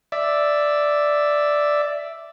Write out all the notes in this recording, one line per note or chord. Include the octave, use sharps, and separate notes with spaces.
D5 E5